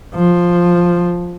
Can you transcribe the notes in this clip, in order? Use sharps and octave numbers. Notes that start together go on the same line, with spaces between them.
F3